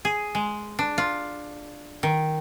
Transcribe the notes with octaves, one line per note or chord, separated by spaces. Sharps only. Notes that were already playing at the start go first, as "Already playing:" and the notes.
G#4
G#3
D4
F4
D#3